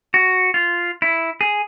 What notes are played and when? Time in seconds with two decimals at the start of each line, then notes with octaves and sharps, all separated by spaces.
0.14 F#4
0.54 F4
1.02 E4
1.41 G#4